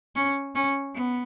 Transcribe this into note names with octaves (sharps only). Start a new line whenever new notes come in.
C#4
C#4
B3